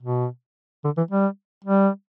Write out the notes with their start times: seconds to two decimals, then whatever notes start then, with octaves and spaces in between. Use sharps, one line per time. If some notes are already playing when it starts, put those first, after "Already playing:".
0.03 B2
0.85 D3
0.97 E3
1.11 G3
1.64 G3